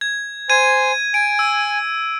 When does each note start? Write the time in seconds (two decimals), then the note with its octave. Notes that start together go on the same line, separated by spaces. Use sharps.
0.01 G#6
0.50 C5 G#5 G#6 D#7
1.14 G#5 D7
1.39 E6